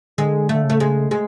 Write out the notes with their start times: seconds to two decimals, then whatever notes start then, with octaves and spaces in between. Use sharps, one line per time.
0.18 D3 G#3
0.49 D3 A3
0.64 C#3
0.70 A3
0.80 G#3
1.11 G#3